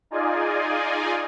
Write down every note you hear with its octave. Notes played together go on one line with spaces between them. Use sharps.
D#4 F4 G#4 D5 D#5 G#5